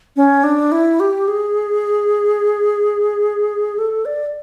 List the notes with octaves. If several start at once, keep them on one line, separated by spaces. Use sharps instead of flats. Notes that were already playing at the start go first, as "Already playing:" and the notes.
C#4
D4
E4
G4
G#4
A4
D5